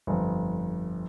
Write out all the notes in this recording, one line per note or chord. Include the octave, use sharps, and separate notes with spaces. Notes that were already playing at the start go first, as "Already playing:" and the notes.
G1 F2